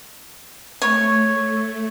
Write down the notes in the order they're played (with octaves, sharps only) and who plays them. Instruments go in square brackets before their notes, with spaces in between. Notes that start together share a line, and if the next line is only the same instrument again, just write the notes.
[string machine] A3 [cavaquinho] C#5